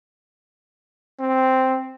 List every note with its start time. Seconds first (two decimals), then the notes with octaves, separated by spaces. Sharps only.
1.20 C4